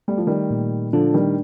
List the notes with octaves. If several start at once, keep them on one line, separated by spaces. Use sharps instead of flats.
G3 A3
F3
D#3 G3
A#2
D3 F3 D4
D#3 G3